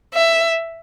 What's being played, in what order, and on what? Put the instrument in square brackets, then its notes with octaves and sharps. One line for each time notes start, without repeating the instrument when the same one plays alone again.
[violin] E5